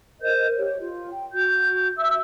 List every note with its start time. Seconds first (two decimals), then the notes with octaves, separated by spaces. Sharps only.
0.20 A#4 C5 D#5 G6
0.56 G4 C#5
0.79 F4
1.08 G5
1.32 F#4 G6
1.97 E5 E6